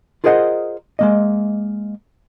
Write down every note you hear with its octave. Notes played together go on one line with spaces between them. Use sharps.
F4 G#4 A#4 C5 D#5 F#5
G#3 A#3 D#5